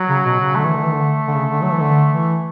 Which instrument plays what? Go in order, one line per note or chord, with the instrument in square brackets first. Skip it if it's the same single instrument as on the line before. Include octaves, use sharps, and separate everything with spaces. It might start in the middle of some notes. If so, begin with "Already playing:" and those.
Already playing: [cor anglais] F#3
[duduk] C#3
B2
C#3
[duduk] D3 [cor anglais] A3
[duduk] E3
D3
E3
D3
D3
C#3
D3
F#3
E3
D3
E3